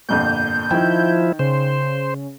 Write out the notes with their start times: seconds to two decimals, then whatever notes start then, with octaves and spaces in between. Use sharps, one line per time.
0.09 G1 F2 A#2 G6
0.71 D#3 F3 E4 G5
1.39 C#3 C5